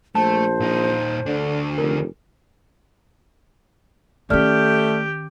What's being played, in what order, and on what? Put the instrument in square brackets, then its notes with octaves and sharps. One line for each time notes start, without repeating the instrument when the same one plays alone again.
[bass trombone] A#1 [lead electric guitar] A3 [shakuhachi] C5 [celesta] A5
[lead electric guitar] A#2 D#4
[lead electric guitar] D2 D4 [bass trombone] D3
[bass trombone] F1 [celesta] A#4
[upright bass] D#3 C#4 [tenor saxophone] A3 [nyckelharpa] G4 G5 [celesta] D5 F6